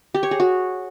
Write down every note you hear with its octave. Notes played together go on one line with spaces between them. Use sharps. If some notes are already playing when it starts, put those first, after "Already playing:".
G4
C#5
G#4
F#4